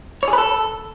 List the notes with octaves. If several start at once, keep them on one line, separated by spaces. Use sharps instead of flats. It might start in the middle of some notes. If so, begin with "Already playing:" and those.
C#5
G#4
B4
A4